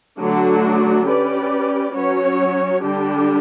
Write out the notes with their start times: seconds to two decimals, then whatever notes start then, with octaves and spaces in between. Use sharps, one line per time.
0.19 D3 F#3 A3 D4 F#4
1.07 C#4 G4 B4 D5
1.95 F#3 C#4 F#4 C#5
2.82 D3 G3 D4 G4